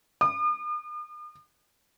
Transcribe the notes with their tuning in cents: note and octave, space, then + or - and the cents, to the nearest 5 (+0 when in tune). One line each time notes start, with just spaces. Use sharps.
D#6 -45